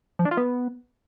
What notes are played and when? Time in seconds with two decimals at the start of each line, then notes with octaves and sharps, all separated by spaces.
0.19 F3
0.25 D4
0.31 F4
0.37 B3